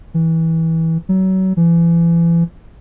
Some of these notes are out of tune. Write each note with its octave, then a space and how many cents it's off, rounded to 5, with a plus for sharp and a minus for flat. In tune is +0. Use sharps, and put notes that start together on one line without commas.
E3 -20
F#3 +30
E3 +35